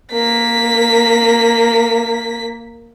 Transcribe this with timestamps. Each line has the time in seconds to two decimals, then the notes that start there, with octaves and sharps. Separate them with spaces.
0.12 A#3 B6